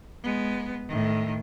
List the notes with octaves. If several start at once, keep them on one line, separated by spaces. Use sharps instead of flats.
G#3 B3
A2 D#3